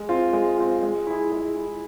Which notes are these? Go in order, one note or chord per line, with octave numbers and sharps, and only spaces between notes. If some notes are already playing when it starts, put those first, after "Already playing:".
Already playing: G#3
C4 F4
G#3
C4 F4
G#3
E4 G#4
G#3
E4 G#4